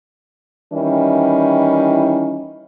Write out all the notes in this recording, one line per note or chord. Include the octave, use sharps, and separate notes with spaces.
D#3 E3 G3 C#4 E4